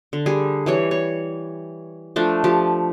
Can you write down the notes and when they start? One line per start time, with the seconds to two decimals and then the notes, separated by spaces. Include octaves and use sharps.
0.13 D3
0.26 G3 G#4
0.66 E3 G3 C#5
0.91 C#5
2.16 F3 A3 D4
2.44 F3 G4